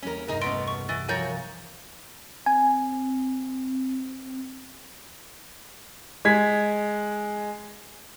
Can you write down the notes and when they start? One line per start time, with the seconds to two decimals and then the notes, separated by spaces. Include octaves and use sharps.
0.02 E2 G3 A#3 C#4 A#4
0.28 C2 G2 D#4 G#4 A#4
0.41 A3 B3 C#4 A4 D#5 C6 D7
0.68 C#6
0.89 E3 A6
1.09 E3 F3 F#4 A#4 C#5 G#5 G6 A6
2.46 C4 G#5
6.25 G#3 G#6 B6